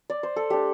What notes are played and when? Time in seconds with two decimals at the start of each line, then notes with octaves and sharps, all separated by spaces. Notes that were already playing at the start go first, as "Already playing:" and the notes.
Already playing: E5
0.10 D5
0.23 C5
0.36 A4
0.50 A3 D4 G4